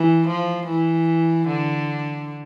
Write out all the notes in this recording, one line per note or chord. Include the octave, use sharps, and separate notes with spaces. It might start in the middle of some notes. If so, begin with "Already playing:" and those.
Already playing: E3
F3
E3
D3